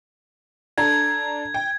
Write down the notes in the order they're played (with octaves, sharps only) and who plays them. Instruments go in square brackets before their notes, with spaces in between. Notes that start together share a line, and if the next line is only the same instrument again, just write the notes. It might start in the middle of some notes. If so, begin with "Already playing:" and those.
[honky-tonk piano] D4 A4 A#5 [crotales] G#6
[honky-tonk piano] G5